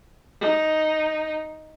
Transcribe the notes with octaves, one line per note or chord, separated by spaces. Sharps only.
D#4